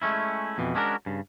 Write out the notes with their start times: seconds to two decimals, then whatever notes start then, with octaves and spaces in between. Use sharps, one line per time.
0.02 G#3 A3 C#4 E4
0.58 F2 B2 E3
0.75 G#3 C#4 D4 F#4 A4 A#4
1.06 G2 C#3